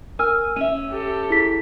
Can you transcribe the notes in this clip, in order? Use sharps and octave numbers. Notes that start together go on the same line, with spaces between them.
A#4 G#5 E6 F6
C#4 E5 D#7
G4 A4
E4 G#4 B6